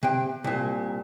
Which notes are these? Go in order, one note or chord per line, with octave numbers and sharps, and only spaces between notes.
C3 G5
C2 A#2